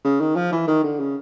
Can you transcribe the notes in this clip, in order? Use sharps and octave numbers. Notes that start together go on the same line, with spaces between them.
C#3
D#3
F3
E3
D#3
D3
C#3